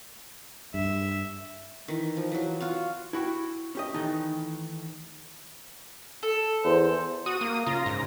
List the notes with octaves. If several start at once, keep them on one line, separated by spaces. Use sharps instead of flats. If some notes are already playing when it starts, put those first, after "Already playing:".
G2 E5
D#3 E3
F3
E3 F#3
F4 F#4 F5
E4 F#4 F#5 G5
C#4 G4 D#5
D#3 E3 A3 D#4
A4
E2 C5
F#4 D#6
A#3
C#3 F4 A#5
G#2